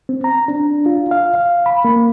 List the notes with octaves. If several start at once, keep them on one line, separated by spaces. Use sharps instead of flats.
C4
A#5
D4
F4
F5
F5
B5
A#3